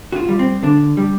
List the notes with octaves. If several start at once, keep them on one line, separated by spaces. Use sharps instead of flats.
F#4
F4
G3
C4
D3 D4
G3